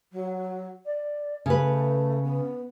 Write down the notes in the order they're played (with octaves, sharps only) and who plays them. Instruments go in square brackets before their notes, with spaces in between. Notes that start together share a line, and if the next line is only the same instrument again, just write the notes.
[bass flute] F#3
D5
[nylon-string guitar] C#3 B4 [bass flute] A3
[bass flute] B3